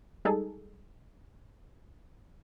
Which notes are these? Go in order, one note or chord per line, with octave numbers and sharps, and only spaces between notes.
G3 G#3 D#4 G#4 A4